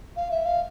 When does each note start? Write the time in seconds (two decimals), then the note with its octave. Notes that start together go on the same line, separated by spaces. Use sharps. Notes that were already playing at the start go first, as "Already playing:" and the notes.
0.16 F5
0.31 E5
0.45 F5